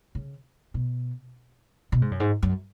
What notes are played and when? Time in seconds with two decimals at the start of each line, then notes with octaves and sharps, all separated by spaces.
0.15 C#3
0.74 B2
1.92 B2
2.02 G#2
2.11 F#2
2.20 G#2
2.43 F#2